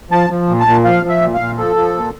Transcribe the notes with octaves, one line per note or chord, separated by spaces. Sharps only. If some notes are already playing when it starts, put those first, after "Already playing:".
F3 A5
F3
A#2
A5
A#2
F3 F5
F3
E5
A#2
F5
A#2
F3 A4
F3
A#2